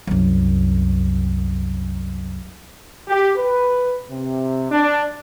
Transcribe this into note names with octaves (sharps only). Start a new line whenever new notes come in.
C2 F#2
G4
B4
C3
D4